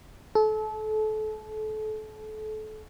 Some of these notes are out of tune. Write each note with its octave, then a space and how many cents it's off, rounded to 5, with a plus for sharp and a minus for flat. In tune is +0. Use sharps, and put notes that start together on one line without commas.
A4 -30